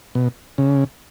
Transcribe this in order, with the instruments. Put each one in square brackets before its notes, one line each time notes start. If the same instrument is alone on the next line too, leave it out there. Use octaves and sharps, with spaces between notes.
[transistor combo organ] B2
C#3